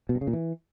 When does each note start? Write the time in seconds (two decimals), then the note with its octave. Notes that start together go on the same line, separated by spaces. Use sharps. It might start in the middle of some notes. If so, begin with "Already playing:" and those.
0.09 B2
0.15 G2
0.21 C#3
0.27 A#2
0.33 E3